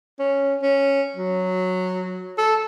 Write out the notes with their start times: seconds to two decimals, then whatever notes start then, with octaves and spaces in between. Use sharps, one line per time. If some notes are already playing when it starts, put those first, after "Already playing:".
0.19 C#4
0.62 C#4
1.16 F#3
2.38 A4